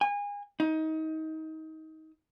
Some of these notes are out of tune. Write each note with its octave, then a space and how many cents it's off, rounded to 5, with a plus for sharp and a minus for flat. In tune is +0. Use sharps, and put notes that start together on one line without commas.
G#5 -30
D#4 +25